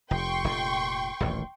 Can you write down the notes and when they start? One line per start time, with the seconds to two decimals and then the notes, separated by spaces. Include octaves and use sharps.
0.11 F1 G5 C6 C#6
0.44 F1 A#2
1.20 D#1 A1 D2